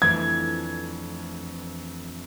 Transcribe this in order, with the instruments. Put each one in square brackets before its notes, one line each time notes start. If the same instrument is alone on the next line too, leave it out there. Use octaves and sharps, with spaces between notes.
[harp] F2 E3 A3 D4 [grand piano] G#6